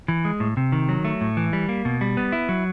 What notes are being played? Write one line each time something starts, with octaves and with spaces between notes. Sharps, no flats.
E3
G#3
A2
C3
D#3
F#3
A3
A2
E3
G3
A#3
B2
G3
B3
E4
F#3